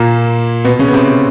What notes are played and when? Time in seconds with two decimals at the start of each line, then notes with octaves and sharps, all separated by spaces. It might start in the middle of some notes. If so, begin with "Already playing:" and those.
Already playing: A#2 A#3
0.64 B2 B3
0.79 C#3 C#4
0.88 B3
0.93 C3 C4